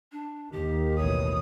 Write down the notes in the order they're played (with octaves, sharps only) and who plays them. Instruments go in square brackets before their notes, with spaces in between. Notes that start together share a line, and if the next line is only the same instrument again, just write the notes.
[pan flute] D4
[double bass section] D#2 D#3 [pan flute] G4
[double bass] A1 B2 [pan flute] C#5 [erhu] D#6